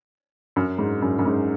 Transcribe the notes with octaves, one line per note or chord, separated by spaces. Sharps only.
F#2
G#2
F#2
F#2
G#2